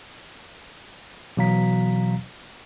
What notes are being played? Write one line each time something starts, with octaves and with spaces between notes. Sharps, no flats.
B2 E3 F#3 F5 A#5 B6